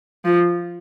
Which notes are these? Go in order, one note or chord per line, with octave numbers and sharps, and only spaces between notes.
F3